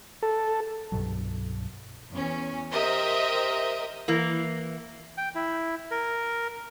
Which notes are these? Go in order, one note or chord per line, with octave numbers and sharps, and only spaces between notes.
A4
C2 G2 B2 F#3
E2 C#4
G4 A#4 C5 D#5 E5
E3 A#3
G5
E4
A#4